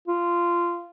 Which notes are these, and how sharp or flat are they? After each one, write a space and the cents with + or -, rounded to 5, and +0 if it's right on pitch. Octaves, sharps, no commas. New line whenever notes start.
F4 -15